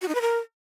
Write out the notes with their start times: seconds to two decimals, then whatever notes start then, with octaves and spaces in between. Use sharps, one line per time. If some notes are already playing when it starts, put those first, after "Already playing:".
0.02 F#4
0.08 D#4
0.15 B4
0.21 A#4